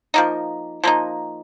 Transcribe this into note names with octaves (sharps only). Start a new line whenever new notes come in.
F3 A#3 D#4
F3 A#3 D#4